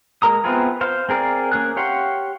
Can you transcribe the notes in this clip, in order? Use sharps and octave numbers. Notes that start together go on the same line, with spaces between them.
G#3 A#3 A#4 A#5 D#6
B3 C4 E4 F4 G#4
C5 F5
C4 G#4 A#4 D5 F5
A#3 C#4 G#4 F#6
G4 C#5 F5 F#5 C6